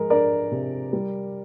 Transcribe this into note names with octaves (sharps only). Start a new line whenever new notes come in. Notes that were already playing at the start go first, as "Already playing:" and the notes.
Already playing: F3 G#3 A#4
D4 A#4 D5
C3
G3